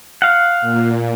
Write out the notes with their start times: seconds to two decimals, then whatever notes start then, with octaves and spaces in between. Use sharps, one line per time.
0.22 F5 F#5
0.61 A#2